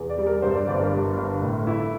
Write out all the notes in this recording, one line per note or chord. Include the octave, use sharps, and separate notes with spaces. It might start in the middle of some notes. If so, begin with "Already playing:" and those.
Already playing: E2
D5
G3
A#4
G2 C5
D5
G1 D5
A#4
G2
G1
A2
E4